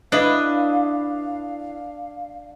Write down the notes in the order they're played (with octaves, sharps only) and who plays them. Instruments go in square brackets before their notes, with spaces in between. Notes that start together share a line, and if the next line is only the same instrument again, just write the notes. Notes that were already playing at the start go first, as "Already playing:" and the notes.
[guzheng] D4 [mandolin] E4 B4 D#5 [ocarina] F5